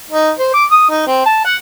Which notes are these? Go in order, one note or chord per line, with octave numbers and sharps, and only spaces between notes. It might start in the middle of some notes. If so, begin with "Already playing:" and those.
D#4
C5
D6
D#6
D#4
C4
A5
F#5